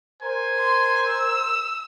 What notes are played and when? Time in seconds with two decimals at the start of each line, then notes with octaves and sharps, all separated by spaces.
0.22 A#4 C5 G#5
0.59 C6
1.06 E6